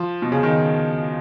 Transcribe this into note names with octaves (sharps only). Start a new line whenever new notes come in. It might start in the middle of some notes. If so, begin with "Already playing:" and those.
Already playing: F3
B2
C#3
D#3